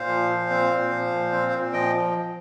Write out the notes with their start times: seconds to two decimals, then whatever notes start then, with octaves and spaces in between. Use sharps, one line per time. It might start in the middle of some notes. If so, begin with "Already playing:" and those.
Already playing: A#2 C5 F5
0.08 F3
0.29 A#2
0.50 C4
0.70 A#2
0.91 F3
1.11 A#2
1.32 C4
1.52 A#2
1.73 F3 D#5 G5